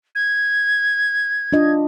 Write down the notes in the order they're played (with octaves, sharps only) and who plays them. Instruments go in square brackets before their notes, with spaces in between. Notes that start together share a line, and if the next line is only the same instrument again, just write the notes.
[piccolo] G#6
[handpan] D4 F4 D#5